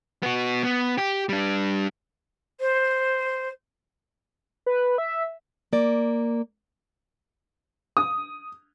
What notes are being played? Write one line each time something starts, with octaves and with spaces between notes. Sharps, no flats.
B3 F#4
B3
G4
G3 D4
C5
B4
E5
A#3 D5
D#6